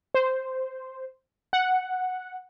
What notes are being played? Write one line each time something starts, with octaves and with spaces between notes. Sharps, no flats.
C5
F#5